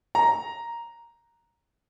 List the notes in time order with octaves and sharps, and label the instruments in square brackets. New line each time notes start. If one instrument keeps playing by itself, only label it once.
[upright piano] A#5